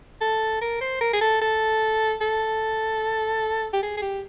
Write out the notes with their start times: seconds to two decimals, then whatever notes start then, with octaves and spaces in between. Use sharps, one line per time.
0.21 A4
0.61 A#4
0.81 C5
1.01 A#4
1.13 G#4
1.21 A4
1.42 A4
2.21 A4
3.73 G4
3.83 G#4
3.97 G#4
4.02 G4